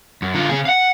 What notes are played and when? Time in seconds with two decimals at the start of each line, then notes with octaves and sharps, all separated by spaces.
0.22 F#2
0.34 D3 F4
0.49 C#3 G#4
0.65 F5 F#5